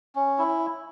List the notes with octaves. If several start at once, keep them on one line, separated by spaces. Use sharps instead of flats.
C#4
E4